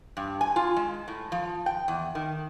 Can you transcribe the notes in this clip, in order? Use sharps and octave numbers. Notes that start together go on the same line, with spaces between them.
G2
G#5
F4
G#3
A2
F3
G5
E2
D#3